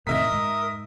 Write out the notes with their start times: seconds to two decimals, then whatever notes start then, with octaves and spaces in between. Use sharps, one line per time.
0.07 A2 C3 D#3 A#4 D#5 E5 D#6 B6
0.32 G#2